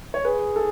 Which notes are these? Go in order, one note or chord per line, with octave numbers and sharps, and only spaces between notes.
C#5
G#4 B4
A4